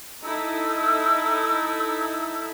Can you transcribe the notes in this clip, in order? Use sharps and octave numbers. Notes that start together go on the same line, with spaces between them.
D#4 E4 A4 E6